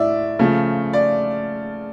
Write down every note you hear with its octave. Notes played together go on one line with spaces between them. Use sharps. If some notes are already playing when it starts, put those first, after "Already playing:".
Already playing: A2 E3 D5 E5
C#3 F3 A3
D5